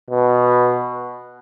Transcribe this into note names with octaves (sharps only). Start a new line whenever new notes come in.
B2